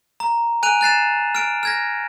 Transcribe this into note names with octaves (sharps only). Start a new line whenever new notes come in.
A#5
G#5 F#6 D#7 F7
F#6 A6 C7 E7
F6 D7
F6 G#6 A#6